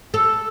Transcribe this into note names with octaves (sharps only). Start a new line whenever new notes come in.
A4